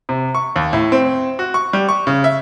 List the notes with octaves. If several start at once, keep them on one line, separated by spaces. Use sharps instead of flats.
C3
C#6
D#2
A2
C4
F#4
C#6
G3
C#6
C#3
E5